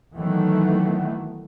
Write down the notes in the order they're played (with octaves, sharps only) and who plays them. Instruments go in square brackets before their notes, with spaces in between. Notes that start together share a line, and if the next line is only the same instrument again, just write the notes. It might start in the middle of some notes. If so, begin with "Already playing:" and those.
[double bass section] D#3 E3 F#3 A3 B3